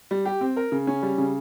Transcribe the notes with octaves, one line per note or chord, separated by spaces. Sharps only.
G3
G4
C4
A#4
C#3
C#4
G3
C#3